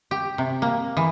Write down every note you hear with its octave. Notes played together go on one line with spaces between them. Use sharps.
G4
C3
A#3
E3